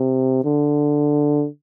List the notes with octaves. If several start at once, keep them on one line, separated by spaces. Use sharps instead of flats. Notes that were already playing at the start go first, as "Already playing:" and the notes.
Already playing: C3
D3